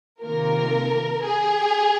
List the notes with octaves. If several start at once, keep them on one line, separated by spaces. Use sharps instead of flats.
C3 D#3 A#3 F4 A#4
G#4